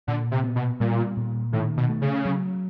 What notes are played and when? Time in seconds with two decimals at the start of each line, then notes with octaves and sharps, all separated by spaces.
0.08 A#2 D3
0.31 C3
0.44 B3
0.56 B2
0.80 A#2 G3
1.17 A#2
1.53 A2 D#3
1.77 B2
1.89 A3
2.02 C#3
2.25 F#3